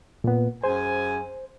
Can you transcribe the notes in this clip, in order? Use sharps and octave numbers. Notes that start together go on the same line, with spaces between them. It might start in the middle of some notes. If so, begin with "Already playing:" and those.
A#2 B3
F#2 G#4 C5 G#5